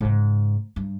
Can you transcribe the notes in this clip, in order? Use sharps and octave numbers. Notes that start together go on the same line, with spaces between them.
G#2 C#3
G2